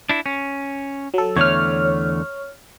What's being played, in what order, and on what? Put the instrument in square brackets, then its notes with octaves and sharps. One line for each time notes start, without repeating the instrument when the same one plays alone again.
[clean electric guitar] D4 E4
C#4
[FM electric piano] F#3 A4
[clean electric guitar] E2 D3 A3 [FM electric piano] C#5 F6